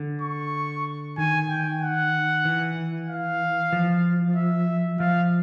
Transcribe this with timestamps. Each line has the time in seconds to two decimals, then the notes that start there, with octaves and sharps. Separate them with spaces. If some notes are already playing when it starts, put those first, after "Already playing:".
Already playing: D3
0.22 C#6
1.18 D#3 G#5
1.49 G5
1.81 F#5
2.45 E3
3.09 F5
3.73 F3
4.36 E5
5.00 F3 F5